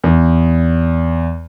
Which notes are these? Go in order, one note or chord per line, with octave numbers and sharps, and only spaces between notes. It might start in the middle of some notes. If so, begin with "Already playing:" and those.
E2